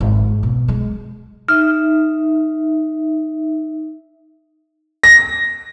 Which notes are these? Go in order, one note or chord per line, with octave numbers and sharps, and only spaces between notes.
G#1
B2
G#3
D#4 E5 F6
A#6